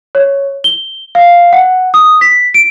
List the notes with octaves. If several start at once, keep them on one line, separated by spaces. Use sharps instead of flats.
C#5
G7
F5
F#5
D#6
B6
D7